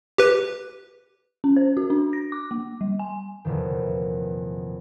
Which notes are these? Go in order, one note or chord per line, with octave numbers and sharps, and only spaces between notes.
G4 B4
C#4
C5
F#4
D4
A#6
D6
A#3
G3
G#5
F1 E2 A#2 D#3